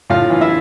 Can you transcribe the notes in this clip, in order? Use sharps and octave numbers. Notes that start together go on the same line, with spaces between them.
A2 F4 F5
E3
E4 E5